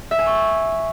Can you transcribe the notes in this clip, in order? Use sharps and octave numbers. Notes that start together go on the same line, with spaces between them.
E5
G#5
C#6